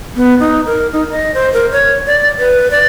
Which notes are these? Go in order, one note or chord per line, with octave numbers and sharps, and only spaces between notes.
B3
D#4
A#4
D#4
D#5
C5
A#4
C#5
D5
B4
D5